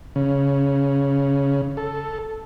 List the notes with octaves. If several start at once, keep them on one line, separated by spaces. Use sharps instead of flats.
C#3
A4